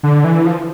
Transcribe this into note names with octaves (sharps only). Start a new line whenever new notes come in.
D3
E3
F3